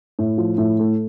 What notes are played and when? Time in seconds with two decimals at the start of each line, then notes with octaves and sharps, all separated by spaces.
0.19 A2
0.38 F3
0.58 A2
0.79 A3